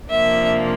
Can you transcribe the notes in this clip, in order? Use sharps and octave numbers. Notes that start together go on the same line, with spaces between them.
C3 F3 A#3 D4 E5